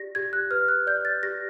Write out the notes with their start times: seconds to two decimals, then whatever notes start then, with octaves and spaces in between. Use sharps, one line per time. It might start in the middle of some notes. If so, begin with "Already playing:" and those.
Already playing: G4 D5 A#6
0.15 G4 G#6
0.33 F#6
0.51 B4 F6
0.68 F#6
0.87 D5 G6
1.05 A6
1.23 G4 A#6